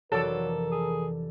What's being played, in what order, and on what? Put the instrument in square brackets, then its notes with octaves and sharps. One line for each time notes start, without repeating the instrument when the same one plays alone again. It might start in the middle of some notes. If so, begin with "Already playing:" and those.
[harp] F1 E3 D5 [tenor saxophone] F#3 [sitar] A4 [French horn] A#4
[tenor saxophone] G#4